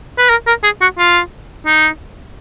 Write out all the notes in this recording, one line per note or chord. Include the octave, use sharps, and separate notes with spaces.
B4
A#4
A#4
G#4
F#4
F4
D#4